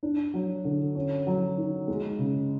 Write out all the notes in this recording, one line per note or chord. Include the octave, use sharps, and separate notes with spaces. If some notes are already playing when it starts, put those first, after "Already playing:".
D4
F#3
D3
C#4
F#3
D#3
G#3
C#3